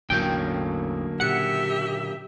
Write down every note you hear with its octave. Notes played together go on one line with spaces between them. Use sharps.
A1 E2 A2 D3 F#3 A#3 G5
A#2 C#3 G4 E5 F#5 C#7